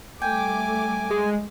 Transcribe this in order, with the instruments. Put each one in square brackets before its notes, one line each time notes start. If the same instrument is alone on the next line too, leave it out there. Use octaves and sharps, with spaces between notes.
[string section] G3 A3 D6 [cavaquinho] G5 [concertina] G#5
[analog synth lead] G#3